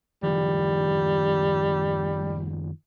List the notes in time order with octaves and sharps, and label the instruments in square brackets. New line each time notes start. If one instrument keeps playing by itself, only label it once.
[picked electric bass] F#1 D#3 F3 [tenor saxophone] G3